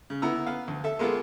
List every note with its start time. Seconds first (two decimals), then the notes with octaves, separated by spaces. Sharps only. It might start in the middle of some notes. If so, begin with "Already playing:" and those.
0.10 C#3
0.22 D3 B3 E4 A#5 E6
0.46 B3 F5
0.68 D2
0.84 A4 E5
0.99 G#3 A#3 B3 F4 G#4 A4